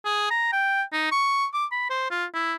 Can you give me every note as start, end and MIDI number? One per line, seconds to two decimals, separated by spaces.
0.05 0.28 68
0.30 0.50 82
0.52 0.83 79
0.92 1.07 63
1.12 1.46 85
1.53 1.66 86
1.72 1.86 83
1.90 2.09 72
2.10 2.25 65
2.34 2.54 64